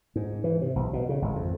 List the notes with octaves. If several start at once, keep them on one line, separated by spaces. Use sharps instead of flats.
G#2
E3
C3
B1
B2
C#3
G#1
F2